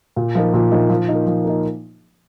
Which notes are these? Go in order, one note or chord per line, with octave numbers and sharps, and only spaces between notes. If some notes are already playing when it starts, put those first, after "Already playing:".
A#2
F3 A#3 D#4
A#2
F3 A#3 D#4
F3
A#3 D#4
F3
A#3 D#4